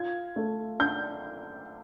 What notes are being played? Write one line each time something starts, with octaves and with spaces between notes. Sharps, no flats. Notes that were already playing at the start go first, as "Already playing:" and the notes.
Already playing: F4 G#6
A3
D4 G6